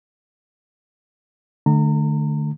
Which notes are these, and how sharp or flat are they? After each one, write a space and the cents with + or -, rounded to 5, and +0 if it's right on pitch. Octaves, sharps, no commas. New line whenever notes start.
D3 +40 A3 -5 A#5 -30